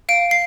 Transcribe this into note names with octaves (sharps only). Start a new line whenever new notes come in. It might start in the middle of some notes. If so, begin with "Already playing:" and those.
F5 D7
C7